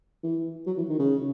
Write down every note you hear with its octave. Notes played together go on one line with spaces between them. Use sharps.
E3
F#3
E3
D#3
C#3